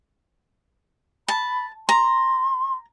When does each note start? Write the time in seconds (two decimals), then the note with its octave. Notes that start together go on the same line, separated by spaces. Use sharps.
1.28 A5 B5
1.89 A#5 C6